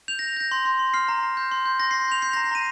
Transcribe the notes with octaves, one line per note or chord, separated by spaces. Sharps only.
G6 F7
G6 A#6
G6 A#6
C6
C6
C6
F6 C7
A#5
A#5
G6
C6
G6
C6 A#6
C7
C6
C7
G6 F7
G6 C7
A#5 A#6
C7
A#5 D#7